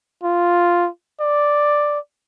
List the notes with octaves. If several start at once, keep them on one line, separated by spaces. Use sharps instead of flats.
F4
D5